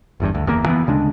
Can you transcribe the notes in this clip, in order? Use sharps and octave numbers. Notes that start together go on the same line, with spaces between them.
G1 E2 G2
D2
F#1 E2 C#3 A#3
E3 B3
D2 C#3 G#3 D4